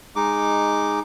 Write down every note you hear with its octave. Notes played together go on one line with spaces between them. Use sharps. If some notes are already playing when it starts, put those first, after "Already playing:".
G#3 D#4 D6